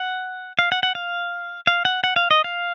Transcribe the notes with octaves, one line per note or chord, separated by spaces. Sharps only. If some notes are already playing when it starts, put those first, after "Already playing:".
Already playing: F#5
F5
F#5
F#5
F5
F5
F#5
F#5
F5
D#5
F5